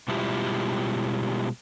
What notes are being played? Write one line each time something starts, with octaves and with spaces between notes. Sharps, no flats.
B2 G3 G#3 E4 F4 G4